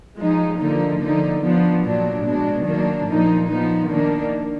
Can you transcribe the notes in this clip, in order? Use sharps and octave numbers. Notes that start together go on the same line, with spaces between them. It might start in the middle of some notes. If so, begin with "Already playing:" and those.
F3 G#3 D#4
D3 F3 A#3 D#4
D3 F3 A#3 D#4
F3 B3 D4
A#2 F#3 D4
B2 G#3 D4
D#3 F#3 A#3 D4
A#2 F3 A#3 D#4
F3 B3 D#4
D#3 A#3 D4